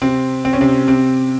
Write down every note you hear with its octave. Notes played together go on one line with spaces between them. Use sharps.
C3 C4
C4
C#4
C3 C4
C3 C4